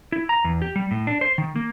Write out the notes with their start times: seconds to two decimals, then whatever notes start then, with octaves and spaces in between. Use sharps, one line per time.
0.12 E4
0.29 A#5
0.44 E2
0.62 G4
0.76 G3
0.91 A2
1.07 D4
1.21 C5
1.38 D#3
1.56 A#3